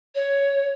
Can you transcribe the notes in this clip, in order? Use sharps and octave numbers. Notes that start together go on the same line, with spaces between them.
C#5